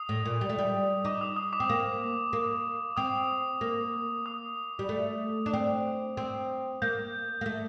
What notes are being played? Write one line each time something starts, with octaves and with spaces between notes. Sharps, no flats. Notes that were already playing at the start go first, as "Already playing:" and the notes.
Already playing: D#6
A2
A#2
G3
A3
G3
D#4 D6
D#6
D#6
D6
C4
A#3
A#3
C4 D#6
A#3
D#6
G3
A3
D4
C4
C4
A#3 G6
A#3
A3